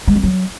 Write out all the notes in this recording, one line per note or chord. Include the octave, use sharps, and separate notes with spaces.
G#3
C4
F#3